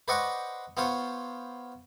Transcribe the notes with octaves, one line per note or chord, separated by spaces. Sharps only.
B4 C5 D5 D#5 F#5 C#6
B3 F4 C5 C#5